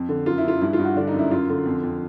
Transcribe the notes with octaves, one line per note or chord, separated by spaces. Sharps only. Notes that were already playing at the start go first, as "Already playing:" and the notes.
Already playing: F2
D3
F#2 F4
E4
F#2 F4
G2 E4
F4
G2
F#4
D3 D4
D#4
F#2 E4
F#2 F4
D3
F2
F2